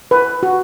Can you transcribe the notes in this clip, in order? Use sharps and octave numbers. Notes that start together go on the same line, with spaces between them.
B4
F#4